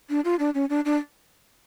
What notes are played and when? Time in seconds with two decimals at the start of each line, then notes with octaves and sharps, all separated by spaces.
0.10 D4
0.25 F4
0.39 D4
0.55 C#4
0.70 D4
0.85 D4